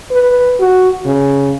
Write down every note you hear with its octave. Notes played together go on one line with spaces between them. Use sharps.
B4
F#4
C#3